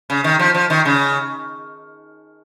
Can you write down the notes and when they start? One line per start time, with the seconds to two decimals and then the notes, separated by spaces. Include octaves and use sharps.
0.10 C#3
0.24 D#3
0.39 F3
0.54 F3
0.70 D#3
0.85 C#3